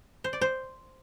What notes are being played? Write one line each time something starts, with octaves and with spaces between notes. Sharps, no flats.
C5
D5
C5